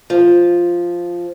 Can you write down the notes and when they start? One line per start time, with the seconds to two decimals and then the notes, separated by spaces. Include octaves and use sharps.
0.10 F3